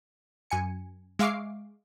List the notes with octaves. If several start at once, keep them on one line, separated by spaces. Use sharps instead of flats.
F#2 G#5 C#7
G#3 E5 F5 C#6 D6 C7